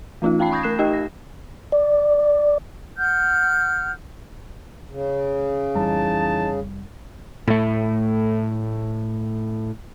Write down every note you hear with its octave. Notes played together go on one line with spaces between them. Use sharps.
E3 A3 C#4 D#4 F4
F4 F5 G5 A5 B5 C7
B5 C#6 D#6 G6 G#6 A#6
A3 A#4 F#6 C7 E7
D#4 G4 D#5 G5
A#6
D5
F#5 F6 G6
C#3
F1 E3 G3 D#4 A5
A2 A3